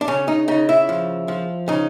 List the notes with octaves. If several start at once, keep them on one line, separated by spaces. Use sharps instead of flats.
D4
C#3 C#4
D#4
C#3 D#4
E4
F3
F3
C#3 D#4